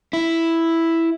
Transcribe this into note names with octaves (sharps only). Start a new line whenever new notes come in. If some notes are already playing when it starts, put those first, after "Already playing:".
E4